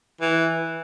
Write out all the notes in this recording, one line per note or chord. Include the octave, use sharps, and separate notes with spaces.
E3